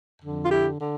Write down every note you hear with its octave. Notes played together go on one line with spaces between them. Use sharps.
F2 D3
F4
E4 G4
D3